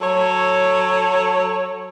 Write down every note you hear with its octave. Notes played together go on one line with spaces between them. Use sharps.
F#3 A4 C#5